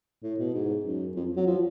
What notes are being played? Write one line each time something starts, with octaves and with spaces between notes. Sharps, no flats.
A2
B2
G#2
F#2
F2
F#3
F3